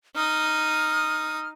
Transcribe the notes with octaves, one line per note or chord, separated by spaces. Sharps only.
D#4 D#6 F6